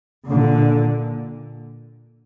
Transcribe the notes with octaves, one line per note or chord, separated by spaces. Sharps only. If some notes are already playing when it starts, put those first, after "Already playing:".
A#2 D3